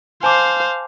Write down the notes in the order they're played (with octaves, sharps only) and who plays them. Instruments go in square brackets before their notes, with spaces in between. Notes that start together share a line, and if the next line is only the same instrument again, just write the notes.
[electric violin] C5 F5 [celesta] G#5 A5 D6